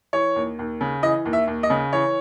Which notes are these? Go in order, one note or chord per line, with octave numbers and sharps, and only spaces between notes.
E3 C#5
D#2
D#2
C#3
E3 D#5
D#2
E5
D#2
D#5
C#3
E3 C#5